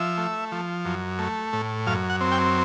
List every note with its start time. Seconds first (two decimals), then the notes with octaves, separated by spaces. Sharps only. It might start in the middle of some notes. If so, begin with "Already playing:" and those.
Already playing: F3 E5
0.18 A3
0.52 F3
0.85 F#2
1.19 A3
1.53 A2
1.87 F#2 F5
2.10 F#5
2.21 C4
2.31 G5